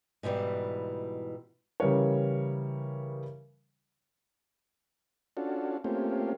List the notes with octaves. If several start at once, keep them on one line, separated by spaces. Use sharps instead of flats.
G#2 B2 E3 G3
C#3 E3 G3 A#4 C#5
C#4 D4 F4 F#4 A4
A3 A#3 C4 C#4 F4 G4